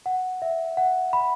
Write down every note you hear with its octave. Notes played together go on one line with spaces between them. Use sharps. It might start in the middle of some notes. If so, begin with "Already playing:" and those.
F#5
E5
F#5
B5